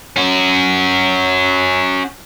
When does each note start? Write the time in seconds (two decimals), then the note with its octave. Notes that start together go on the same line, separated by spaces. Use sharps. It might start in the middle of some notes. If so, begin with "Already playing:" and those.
0.16 C#4 F#4